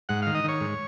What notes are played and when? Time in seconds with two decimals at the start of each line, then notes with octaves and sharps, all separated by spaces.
0.09 G#2 F#5
0.22 D#3 F5
0.35 D#5
0.44 D#3 C#5
0.61 G#2